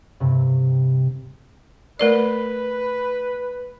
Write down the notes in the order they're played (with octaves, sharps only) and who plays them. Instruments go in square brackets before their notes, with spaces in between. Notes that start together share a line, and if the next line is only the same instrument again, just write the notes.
[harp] G2 C3
[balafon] A3 A#4 D5 [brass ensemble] B4